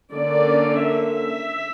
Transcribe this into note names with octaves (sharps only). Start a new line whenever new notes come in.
D3 A#3 C#4 D5
E5